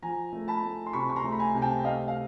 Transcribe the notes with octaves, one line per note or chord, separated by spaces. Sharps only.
F3 G#5 A#5
A3
A5 B5
A3
C6
C3 B5 C#6
C#6
A#5 C6
A3
B5
G#5 A#5
C3 G#5
G5 A5
A3 D#5 F5
F5